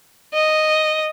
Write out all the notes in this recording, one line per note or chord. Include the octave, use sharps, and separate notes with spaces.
D#5